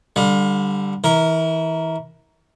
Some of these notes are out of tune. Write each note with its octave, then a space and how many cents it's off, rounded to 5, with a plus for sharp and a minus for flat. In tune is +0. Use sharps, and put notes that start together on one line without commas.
D3 +0 G3 +0 F5 +35
E3 -30 A#4 +0